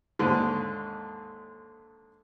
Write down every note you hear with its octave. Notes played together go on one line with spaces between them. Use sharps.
D#2 G#2 D3